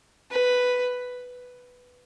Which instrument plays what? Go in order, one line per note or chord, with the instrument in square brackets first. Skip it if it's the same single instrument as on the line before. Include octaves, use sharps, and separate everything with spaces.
[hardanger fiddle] B4